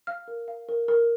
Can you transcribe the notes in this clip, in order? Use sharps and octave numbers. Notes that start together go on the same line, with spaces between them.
F5 F6
A#4
F5
A#4
A#4